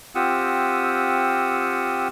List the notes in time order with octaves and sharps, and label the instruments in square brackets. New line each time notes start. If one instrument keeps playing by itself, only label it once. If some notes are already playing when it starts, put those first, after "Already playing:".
[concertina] C4 F4 G4 F#5 D#6 E6